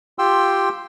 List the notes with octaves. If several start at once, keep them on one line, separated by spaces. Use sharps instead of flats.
F4 G4 G5 C6 E6